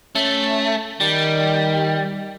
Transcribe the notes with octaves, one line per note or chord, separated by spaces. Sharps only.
A3 C#4
D#3 G3